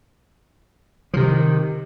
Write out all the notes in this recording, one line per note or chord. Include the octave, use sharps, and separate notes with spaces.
C3 D#3 F3